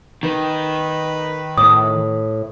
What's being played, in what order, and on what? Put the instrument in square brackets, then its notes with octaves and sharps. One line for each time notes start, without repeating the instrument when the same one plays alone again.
[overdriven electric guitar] D#3 [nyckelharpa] B4
[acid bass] A2 [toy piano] D#6